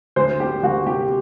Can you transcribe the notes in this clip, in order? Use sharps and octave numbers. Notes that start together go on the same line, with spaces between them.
D2 C5
G3 G4
D2 F#4
C3 G4